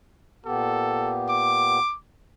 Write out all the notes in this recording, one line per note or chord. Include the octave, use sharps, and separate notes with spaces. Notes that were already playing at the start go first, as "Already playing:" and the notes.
A#2 B3 G4 A4
D6